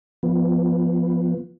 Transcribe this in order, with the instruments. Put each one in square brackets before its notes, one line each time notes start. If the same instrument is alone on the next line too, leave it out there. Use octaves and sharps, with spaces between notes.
[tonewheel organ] F3 B3